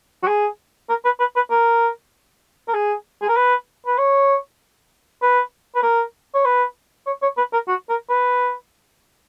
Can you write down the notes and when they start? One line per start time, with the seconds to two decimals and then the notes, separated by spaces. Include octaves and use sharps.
0.23 F#4
0.27 G#4
0.89 A#4
1.05 B4
1.20 B4
1.36 B4
1.50 A#4
2.68 A#4
2.74 G#4
3.22 G#4
3.28 A#4
3.36 B4
3.86 B4
3.98 C#5
5.22 B4
5.75 B4
5.83 A#4
6.35 C#5
6.45 B4
7.07 C#5
7.22 C#5
7.37 B4
7.53 A#4
7.68 F#4
7.89 A#4
8.10 B4